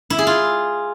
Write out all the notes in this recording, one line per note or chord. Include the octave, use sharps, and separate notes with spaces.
E4
G#4
F4